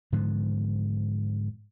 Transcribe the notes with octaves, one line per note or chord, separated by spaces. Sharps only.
G#2 D3 F3